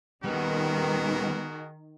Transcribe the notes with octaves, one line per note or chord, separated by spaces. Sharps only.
D#2 D#3 G3 B3 F#4 G#4 A#4